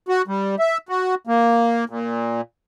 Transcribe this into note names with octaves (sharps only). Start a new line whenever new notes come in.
F#4
G3
E5
F#4
A#3
A#2